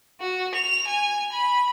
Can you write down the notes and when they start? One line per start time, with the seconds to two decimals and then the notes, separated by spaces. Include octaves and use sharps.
0.20 F#4
0.55 F7
0.87 G#5
1.32 B5